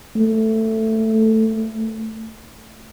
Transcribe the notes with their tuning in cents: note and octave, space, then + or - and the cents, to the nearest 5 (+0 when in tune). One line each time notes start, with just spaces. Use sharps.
A3 +10